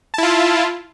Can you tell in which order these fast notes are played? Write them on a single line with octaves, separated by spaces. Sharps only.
A5 E4 F4